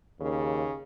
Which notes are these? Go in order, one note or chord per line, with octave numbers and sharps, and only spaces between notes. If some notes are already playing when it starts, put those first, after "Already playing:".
D#2 C#3